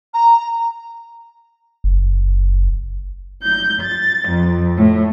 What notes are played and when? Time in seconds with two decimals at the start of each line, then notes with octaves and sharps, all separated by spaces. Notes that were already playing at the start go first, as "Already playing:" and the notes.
0.13 A#5
1.84 F#1
3.42 G6
3.81 A6
4.28 F2
4.76 A2